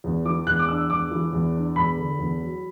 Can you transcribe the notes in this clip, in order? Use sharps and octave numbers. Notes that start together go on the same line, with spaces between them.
E2
E3 D6
E2 F#6
D6
D4 E6
E2 D6
E3
E2
D4
E2 B5
D3
E2
F#3